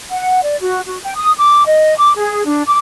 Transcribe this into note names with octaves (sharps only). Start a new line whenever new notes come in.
F#5
D5
F#4
F#4
G5
D#6
D6
D#5
D6
G#4
D4
D6